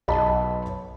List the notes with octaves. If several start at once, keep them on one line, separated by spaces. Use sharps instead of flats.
B1 D#5 A5 B5